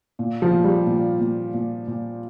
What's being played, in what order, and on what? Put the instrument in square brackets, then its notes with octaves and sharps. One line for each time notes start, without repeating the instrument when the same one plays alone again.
[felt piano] A#2
[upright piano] F3
[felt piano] A#2
[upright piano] G3
[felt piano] A#2
A#2
A#2
A#2